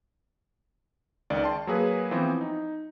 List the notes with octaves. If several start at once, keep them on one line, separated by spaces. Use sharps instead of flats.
C#2 D#3 D5
A5 C6
F#3 A#3 G#4 B4
E3 F3 B3 C4 C5
D#4